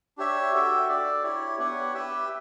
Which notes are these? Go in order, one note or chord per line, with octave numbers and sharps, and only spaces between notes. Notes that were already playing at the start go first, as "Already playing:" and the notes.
D4 G4 C#5 E5
F#4 A4 E5 G5
D4 A4 D5
E4 G4 C#5
B3 D4 G4 C#5 F#5
G4 B4 E5 G5